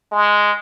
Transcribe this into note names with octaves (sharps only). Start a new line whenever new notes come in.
G#3